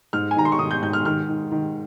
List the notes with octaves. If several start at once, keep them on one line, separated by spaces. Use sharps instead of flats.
G#2 F6
G#5
D#3 A#5
C6
C#6
D#3 D#6
G6
G#2 G6
F6
D#3 F6
D#3
D#3